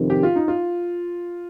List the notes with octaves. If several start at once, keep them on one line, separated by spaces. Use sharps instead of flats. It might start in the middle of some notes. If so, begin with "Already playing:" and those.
Already playing: F2 C3 D#3
G4
F4
D#4
F4